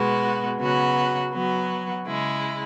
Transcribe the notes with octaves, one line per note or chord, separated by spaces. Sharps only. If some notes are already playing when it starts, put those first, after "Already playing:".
Already playing: B2 G#3 B3 F#4
C#3 F#3 B3 F#4
F#3 B3 F#4
C#3 G#3 E4